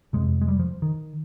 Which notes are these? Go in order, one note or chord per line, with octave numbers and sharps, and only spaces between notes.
F2 C3 G#3
G#3
G3
F3
D#3